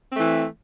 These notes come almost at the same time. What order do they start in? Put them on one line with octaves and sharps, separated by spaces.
C4 A3 E3